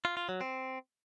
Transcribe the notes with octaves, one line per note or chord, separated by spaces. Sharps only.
F4
F4
F#3
C4